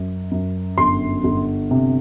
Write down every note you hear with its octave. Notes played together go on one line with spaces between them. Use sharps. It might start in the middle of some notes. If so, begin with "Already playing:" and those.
Already playing: F#2
F#2
G1 C6
G1
C3